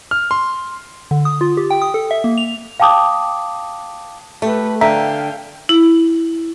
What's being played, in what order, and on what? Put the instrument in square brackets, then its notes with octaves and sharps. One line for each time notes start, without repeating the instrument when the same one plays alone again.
[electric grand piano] F6
C6
[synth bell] D3
D#6
F4
G4
G5
D#6
A4
E5
A#3
F7
[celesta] F5 G5 A5 D6 D#6
[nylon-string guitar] A3 [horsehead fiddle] G4 B4
[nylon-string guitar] D3 [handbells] E5 A#5 [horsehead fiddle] F5 G5
[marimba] E4